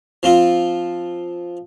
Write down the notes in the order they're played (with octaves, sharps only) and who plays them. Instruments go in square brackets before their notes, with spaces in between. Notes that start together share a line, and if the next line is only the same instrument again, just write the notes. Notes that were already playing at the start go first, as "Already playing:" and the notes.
[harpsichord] F3 C4 F4